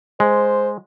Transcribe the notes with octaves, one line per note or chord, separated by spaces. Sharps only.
G#3 C5